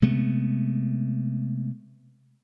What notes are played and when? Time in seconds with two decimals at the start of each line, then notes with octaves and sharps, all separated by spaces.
0.02 C3 G#3 A3 B3